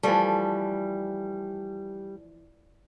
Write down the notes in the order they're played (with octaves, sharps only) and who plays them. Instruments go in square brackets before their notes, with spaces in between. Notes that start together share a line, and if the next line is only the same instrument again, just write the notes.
[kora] E3 F3 A3 [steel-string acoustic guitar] G3